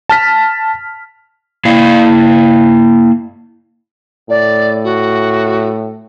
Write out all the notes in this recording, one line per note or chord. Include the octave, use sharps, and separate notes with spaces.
A5 F6 B6
A#3 E4 F5
A2 D5
F#4